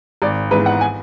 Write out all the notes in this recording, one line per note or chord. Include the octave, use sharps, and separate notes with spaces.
G#1 D5
G#2 E3 B3 B4
F#5
G#5